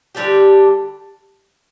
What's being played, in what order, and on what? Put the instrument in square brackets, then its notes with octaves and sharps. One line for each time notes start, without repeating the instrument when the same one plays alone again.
[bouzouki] D3 G3 D4 G4